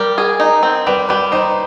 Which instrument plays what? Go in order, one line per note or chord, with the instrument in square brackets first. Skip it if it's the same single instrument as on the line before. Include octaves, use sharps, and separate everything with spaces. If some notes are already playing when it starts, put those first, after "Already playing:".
Already playing: [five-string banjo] G3 [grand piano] A#4
[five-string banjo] G#4
D#4
C4
[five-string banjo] G3 [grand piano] B4
[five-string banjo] G3 [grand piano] B4
[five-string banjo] D#4 [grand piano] C5